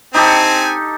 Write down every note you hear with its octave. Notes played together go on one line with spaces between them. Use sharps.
C4 D#4 G4 A4 G#5